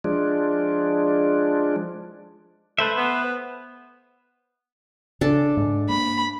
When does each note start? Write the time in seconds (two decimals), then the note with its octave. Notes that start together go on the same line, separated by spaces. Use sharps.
0.04 F3 G#3 D4
2.78 A3 B4 C5 E5
2.96 B3
5.21 C#3 D4 A4
5.57 G#2
5.89 A#3 B5